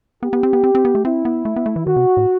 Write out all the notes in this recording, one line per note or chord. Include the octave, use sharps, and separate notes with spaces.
B3 G4
B3
C4
B3
C4
C4
B3
A3
C4 E4
B3
A3
B3
A3
E3
D#3 F#4
C3
A2